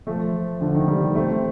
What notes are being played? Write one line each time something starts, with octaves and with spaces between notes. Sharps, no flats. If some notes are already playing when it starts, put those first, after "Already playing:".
F3 A3
D3 F3
D#3
D#3 G3
A3 C4